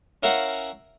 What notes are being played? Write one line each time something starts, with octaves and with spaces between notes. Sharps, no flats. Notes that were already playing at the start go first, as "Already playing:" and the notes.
C#4 E4 A#4 F5 F#5